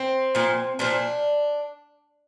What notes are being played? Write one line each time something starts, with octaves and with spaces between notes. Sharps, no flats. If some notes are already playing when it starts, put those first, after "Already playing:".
Already playing: C4
A#2 F3
A#2 F3 D4